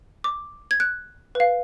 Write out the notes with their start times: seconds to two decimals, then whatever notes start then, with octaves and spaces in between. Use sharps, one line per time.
0.24 D6
0.71 G#6
0.80 F#6
1.35 B4 F5